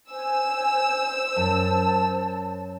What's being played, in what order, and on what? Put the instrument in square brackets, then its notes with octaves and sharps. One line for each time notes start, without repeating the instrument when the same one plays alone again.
[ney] C5 [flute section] G#5 [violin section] E6
[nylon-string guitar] F#2 [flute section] A5